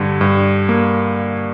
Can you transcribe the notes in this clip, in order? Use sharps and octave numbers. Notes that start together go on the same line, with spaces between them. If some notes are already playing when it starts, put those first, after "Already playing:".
Already playing: G2 D3
G2
A#3